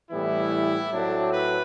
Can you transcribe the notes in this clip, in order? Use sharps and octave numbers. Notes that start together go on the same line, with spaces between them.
A2 E3 G3 B3 E4
A2 F#3 A3 C4 D4
B4